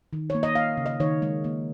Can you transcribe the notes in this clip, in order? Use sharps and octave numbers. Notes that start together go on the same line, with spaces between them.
D#3
A#3 C#5
D#5
A#3 F5
C#3
D#5
D#3 C#5
G#3
A#3